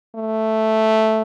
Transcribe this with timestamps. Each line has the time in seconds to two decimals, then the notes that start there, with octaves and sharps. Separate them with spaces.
0.15 A3